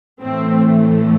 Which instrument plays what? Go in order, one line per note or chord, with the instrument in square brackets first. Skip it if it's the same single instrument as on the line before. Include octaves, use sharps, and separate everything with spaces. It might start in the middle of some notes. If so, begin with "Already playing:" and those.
[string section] A2 E3 A3 C4